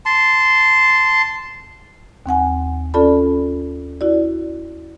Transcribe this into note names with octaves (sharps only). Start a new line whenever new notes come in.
A5 C6
D#2 C4 F#5 G#5
C#4 F4 A4 D5 A5 B5
E4 F#4 D5